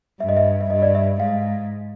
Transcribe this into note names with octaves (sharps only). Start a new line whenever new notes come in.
G2 E5
D#5
E5
E5
G2 D#5
D5
E5
G#2 F5